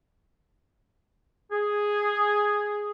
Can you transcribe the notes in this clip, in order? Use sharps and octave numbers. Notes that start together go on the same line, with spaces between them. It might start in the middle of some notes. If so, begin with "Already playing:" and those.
G#4